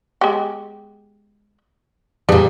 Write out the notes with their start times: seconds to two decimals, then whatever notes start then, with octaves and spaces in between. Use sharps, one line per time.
0.21 G#3 B3 G4
2.29 A#2 G3 D4 G#4 B4